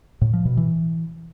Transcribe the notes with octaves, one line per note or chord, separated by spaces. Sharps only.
A2
F3
B2
E3